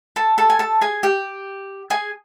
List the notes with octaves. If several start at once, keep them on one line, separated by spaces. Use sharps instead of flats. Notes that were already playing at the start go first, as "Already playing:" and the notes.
A4 A5
A4 A5
G#5
A4 A5
G#4 G#5
G4 G5
G#4 G#5